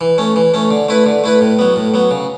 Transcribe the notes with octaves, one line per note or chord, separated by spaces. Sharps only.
E3
A3 C#4
E3
A3 C#4
D3
A3 E4 B4
D3
A3 E4 B4
A2
F#3 B3
A2
F#3 B3
C#3